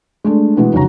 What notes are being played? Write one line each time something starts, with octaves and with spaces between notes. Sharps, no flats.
G#3 A3 D4
B2 E3 G#3 B3
F1 B1 C#3 F#4 A#5